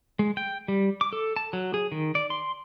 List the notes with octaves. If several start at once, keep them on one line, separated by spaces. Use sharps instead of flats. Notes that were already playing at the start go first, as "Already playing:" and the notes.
G#3
G5
G3
D6
A4
A5
F#3
G#4
D#3
D5
C6